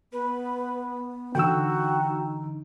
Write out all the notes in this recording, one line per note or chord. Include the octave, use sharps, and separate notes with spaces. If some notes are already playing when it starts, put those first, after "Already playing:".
B3 B4
D3 E3 D#4 F#4 G5 E6